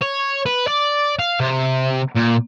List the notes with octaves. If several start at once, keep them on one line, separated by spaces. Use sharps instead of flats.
C#5
B4
D5
F5
C3
A#2